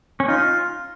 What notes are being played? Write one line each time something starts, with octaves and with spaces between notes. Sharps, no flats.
C#4
D#4 F4